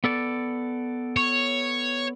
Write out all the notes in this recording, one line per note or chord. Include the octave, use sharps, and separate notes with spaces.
B3 A4 D5
C#5